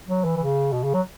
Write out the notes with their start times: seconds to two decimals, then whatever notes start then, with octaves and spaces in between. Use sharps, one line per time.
0.08 F#3
0.25 E3
0.37 E3
0.40 C#3
0.72 B2
0.83 C#3
0.94 F#3